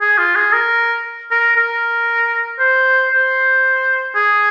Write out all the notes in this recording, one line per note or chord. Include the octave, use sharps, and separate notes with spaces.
G#4
F4
G#4
A#4
A#4
A#4
C5
C5
G#4